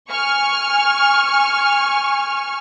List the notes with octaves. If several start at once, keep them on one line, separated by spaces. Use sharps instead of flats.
G#5 C#6 F6